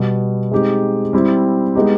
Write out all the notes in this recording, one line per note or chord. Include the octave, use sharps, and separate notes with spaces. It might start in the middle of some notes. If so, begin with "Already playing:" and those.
Already playing: B2 G3 B3
G#3 C4 D#4 G4
G3 C4 E4
G#3 B3 D#4 G4